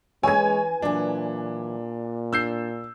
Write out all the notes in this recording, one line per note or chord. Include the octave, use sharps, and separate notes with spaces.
E3 G#3 C#5 G#5 G#6
A#2 E3 F#3 D4
D4 E6 G6 C7